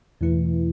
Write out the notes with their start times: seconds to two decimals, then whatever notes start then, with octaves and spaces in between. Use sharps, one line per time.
0.21 E2 B2 E3 A3 E4 B4